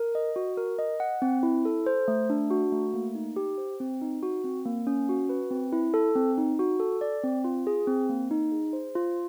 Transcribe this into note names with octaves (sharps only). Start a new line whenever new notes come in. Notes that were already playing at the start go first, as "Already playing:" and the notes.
Already playing: A#4
D#5
F#4
A#4
D#5
F#5
C4
E4
A4
C5
A3
D4
F#4
A3
A#3
D#4
G4
C5
C4
D#4
F#4
C4
A#3
C#4
F#4
B4
C4
E4
A4
C4
D#4
F#4
A4
D5
C4
F4
G#4
C4
A#3
D#4
G#4
C5
F4